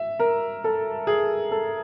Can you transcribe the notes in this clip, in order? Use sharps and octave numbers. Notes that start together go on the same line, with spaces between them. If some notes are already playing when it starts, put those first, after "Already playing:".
Already playing: E5
A#4
A4
G#4
A4